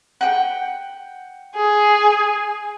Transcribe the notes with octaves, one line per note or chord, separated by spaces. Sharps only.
F#5 G5
G#4